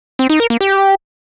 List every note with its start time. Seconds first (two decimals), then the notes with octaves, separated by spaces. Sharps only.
0.19 C4
0.30 D#4
0.40 A#4
0.50 A#3
0.61 G4